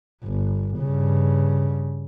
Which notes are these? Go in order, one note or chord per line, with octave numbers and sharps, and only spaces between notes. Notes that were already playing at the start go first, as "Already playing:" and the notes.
G1
G2 C#3